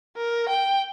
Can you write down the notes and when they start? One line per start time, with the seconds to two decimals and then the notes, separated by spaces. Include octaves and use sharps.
0.17 A#4
0.49 G5